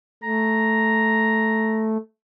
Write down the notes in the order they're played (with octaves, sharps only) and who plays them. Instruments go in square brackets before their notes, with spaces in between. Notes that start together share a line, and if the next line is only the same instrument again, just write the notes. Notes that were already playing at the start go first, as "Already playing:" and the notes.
[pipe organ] A3 [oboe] A#5